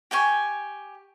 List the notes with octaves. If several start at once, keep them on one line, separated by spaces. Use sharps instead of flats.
G4 G5 G#5 C#6